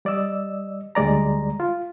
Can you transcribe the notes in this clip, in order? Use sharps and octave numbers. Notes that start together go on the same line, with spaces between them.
G3 D5 D#5 E6
D2 G3 G#3 D5 A#5
F4